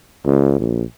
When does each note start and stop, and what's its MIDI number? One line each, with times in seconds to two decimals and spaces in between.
0.25 0.58 37
0.60 0.83 34